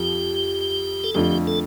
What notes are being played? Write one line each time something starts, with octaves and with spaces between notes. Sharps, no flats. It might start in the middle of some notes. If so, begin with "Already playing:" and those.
Already playing: F2 F3 G4
A4
F2 D3 A3 F4 G4
A4